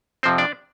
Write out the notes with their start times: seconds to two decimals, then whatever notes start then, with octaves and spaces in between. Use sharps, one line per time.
0.23 F2 C3 F3 C4 C5
0.38 D4 D5